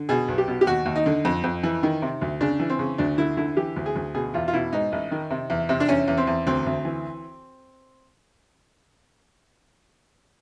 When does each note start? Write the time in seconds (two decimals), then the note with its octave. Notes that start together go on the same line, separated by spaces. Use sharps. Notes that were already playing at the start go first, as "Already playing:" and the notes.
Already playing: D3
0.09 B2 G#4
0.28 B1
0.38 G4
0.48 B2
0.61 G4
0.67 D#2 F#4
0.86 D#2
0.96 D#4
1.06 D3
1.25 F2
1.44 F2
1.63 E3
1.83 D#3
2.02 C3
2.21 D2
2.41 C#3 D4
2.60 E3
2.70 C4
2.79 C#3
2.98 D2 D4
3.18 D3 E4
3.37 D3 E4
3.57 E3 G4
3.76 D2
3.86 G#4
3.95 D2
4.15 B2 G#4
4.34 E2 F4
4.48 F4
4.53 B2 E4
4.72 G#2 D#4
4.92 A1
5.11 D#3
5.30 C3
5.50 E2
5.69 C3
5.80 D4
5.89 E2 C#4
6.08 E2
6.17 C4
6.27 E2
6.47 D2 C4
6.66 D2
6.85 E3